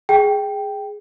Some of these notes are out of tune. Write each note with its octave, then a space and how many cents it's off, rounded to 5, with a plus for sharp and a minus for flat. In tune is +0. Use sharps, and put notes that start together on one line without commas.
G#4 +0 G5 +0